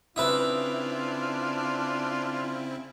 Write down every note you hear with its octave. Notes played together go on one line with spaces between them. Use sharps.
C#3 C4 D4 E4 F4 B4 E5 D#6